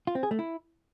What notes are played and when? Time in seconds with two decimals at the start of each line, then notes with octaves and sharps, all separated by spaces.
0.07 F4
0.15 C4
0.23 G#4
0.31 A3
0.39 E4